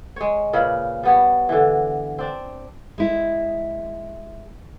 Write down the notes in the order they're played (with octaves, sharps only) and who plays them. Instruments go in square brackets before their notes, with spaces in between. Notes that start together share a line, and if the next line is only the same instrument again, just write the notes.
[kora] G#3 C#5
A#2 C#3 B4
G3 B3 C#5
D3 E3
C4 D4
[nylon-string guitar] G#3 E4